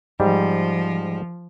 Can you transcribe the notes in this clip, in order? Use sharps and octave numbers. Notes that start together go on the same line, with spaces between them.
G#2 F3 G3